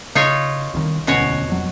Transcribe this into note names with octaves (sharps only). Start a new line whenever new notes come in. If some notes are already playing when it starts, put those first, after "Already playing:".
C#3 D#4 F4 C#5
C2 D#3
E1 D2 B2 C#4 F#4 C#5
F1 F#3